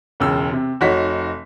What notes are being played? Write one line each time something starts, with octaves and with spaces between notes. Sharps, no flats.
E1 C#2 C#3 E6
C3
F1 D#4 F#4 C#5 B6